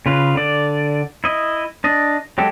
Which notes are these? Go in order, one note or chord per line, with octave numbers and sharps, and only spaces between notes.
C#3 F4 B4
D3 D5
E4 D#5
D4 D#5
F#3 G#3 G4 A4